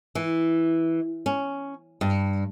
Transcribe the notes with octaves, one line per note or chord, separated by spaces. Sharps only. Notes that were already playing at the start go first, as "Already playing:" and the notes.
E3
C#4
G2